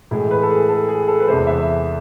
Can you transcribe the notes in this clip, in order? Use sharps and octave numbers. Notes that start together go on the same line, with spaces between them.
A2 E3 G#3
B4
A4
G#4
A4
G#4
A4
B4
E2 C3 G#3 C5
E5